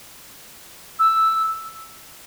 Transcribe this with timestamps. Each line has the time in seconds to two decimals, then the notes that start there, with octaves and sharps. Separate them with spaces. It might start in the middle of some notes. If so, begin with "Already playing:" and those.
0.99 E6